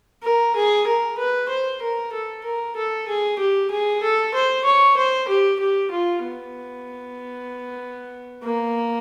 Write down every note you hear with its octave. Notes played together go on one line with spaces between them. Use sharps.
A#4
G#4
A#4
B4
C5
A#4
A4
A#4
A4
G#4
G4
G#4
A4
C5
C#5
C5
G4
G4
F4
B3
A#3